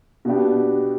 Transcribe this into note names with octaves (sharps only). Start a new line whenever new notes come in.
B2 B3 D4 G4